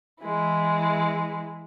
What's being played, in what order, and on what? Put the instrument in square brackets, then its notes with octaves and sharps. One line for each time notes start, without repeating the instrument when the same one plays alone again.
[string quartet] E3 G#3 E4